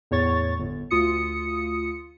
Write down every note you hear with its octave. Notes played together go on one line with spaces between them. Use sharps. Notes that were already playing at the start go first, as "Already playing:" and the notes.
E2 A2 C#5 C#6 A6
G1
D2 F4 D#6 C#7